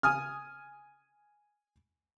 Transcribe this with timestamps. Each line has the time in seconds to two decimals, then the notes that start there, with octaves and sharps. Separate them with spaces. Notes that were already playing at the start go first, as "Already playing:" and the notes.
0.03 G#5 D#6 F6